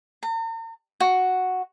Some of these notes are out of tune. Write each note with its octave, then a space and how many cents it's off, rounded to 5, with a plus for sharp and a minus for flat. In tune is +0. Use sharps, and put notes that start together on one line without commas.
A#5 -45
F#4 -5